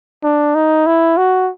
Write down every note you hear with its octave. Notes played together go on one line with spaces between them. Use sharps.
D4
D#4
E4
F#4